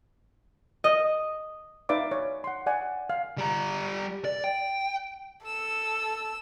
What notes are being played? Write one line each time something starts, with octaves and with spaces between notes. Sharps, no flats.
D#5
D#4 B4 D5 E5 F5 D6
C#5
F#5 C6
D5 F#5 G#5
F5
G3 A#5
D5
G5
A4 E6